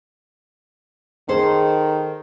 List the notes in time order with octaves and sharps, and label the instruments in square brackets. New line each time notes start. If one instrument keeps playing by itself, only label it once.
[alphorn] D#3 [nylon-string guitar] G#4 A4 C5